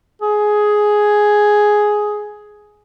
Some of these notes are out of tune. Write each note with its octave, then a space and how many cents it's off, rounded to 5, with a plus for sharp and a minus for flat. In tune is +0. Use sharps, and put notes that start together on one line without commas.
G#4 +5